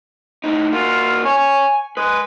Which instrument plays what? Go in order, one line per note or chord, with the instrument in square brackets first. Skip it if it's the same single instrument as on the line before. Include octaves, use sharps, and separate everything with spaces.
[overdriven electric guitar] A2 D#4
[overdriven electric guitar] A#3 F#4 [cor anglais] F4
[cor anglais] C#5 [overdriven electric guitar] G#5
[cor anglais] G#3 [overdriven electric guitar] B4